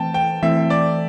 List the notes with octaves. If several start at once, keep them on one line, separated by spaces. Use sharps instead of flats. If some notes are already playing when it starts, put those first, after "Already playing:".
Already playing: E3 A3 C4 G5 A5
G5
E3 A3 C4 E4 E5
D5